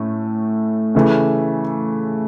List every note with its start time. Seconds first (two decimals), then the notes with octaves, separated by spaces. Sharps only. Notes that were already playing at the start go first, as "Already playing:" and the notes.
Already playing: A2 A3 C#4
0.95 C#3 E3 A3